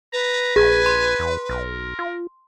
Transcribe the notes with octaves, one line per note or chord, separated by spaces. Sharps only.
B4 A#5
A#1 G#4 G#5
C6
E2
B1 A#4
F4